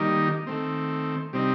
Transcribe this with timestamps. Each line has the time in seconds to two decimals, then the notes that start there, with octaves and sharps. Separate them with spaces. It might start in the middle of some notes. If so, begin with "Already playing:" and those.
Already playing: D#3 G3 A#3 D#4
0.47 D#3 A3 C4
1.33 C3 G3 C4 D#4